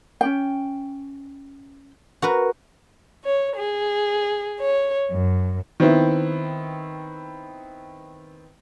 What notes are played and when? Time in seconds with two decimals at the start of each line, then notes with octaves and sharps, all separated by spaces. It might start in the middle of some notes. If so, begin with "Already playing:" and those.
0.21 C#4 D4 G5
2.22 F#4 A#4 B4
3.23 C#5
3.55 G#4
4.60 C#5
5.11 F#2
5.80 D#3 B3 C4 E4